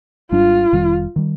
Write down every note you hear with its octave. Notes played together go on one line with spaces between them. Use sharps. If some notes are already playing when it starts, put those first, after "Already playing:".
G#1 G#2 G3 D4 F4
F1 F2 D#3 G3
D#3 G3